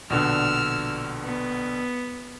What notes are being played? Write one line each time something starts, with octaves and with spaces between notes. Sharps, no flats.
A#1 B2 D3 E6 F6
B3